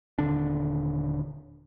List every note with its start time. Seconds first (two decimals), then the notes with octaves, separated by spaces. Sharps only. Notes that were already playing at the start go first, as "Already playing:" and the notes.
0.19 D#1 D3 D4